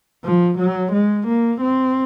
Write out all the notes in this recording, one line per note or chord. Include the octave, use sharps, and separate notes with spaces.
F3
F#3
G#3
A#3
C4